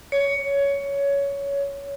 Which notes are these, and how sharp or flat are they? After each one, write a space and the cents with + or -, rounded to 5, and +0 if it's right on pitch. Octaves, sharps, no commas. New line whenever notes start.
C#5 +15